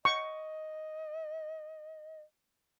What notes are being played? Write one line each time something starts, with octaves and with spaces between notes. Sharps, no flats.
D#5 C#6